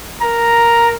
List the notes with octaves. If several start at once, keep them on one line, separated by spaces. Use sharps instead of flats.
A#4 A#5